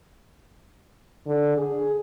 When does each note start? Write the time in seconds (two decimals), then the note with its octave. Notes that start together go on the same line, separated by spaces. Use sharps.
1.26 D3
1.57 G#4